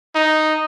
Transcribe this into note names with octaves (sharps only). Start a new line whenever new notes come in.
D#4